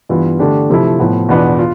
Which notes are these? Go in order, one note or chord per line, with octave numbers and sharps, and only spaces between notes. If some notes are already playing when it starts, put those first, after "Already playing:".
G2 E3 B3 F4
D3 A3 D4 G4
C3 F3 A3 E4
A2 F3 B3
E2 B2 B3 D4 F4
F4